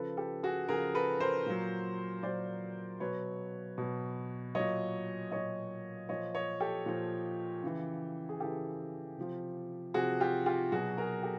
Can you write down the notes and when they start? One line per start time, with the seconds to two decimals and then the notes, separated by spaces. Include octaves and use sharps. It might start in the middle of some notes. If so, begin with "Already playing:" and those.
Already playing: C#3 F3 A4 B4
0.17 G4 A4
0.43 F#4 G#4
0.69 C#3 F3 G#4 A#4
0.95 A4 B4
1.20 A#4 C5
1.46 A#2 F#3
2.23 A#2 F#3 C5 D5
3.00 B2 F#3 B4 C#5
3.78 B2 F#3
4.55 A#2 F#3 C#5 D#5
5.31 A#2 F#3 C#5 D#5
6.09 A#2 F3 C#5 D#5
6.35 C#5 D#5
6.60 G4 A4
6.86 A#2 F3
7.63 C#3 E3
8.29 G#4
8.40 C#3 E3 G4 A4
9.17 C3 F3
9.94 C3 F3 F#4 G#4
10.20 F4 G4
10.46 F4 G4
10.71 B2 F#3 F#4 G#4
10.98 G#4 A#4
11.23 G4 A4